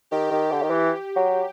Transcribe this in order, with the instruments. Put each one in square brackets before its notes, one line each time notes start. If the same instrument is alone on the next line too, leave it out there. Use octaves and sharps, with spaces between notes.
[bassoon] D#3 [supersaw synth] G4
[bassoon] D#3
D3
D#3
E3
F#3